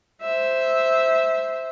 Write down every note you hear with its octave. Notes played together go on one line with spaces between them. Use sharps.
C5 E5